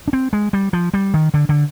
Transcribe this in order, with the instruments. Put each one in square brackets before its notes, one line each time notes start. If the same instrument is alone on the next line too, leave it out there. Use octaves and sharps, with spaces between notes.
[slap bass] D4
C4
G#3
G3
F3
G3
D#3
D3
D3